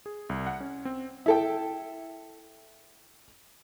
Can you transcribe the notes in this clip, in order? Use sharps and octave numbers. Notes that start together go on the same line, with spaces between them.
G#4
C2
F#5
C#4
C4
E4 A4 G5